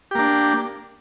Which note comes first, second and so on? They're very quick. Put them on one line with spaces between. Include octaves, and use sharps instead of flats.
G4 A#3 D4